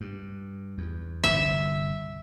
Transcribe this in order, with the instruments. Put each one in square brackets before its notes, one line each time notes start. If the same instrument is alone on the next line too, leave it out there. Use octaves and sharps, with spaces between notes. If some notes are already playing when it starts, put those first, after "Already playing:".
[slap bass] G2
E2
[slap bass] G1 C2 C3 [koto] E5